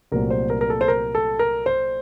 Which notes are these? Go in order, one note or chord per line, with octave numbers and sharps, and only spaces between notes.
C2 A#2 F#3 A3 C4 A#4
C5
A#4
A#4
A4
C5
A#4
A4
A#4
C5